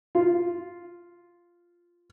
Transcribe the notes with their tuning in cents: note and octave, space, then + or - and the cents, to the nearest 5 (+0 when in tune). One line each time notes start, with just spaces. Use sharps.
F4 -5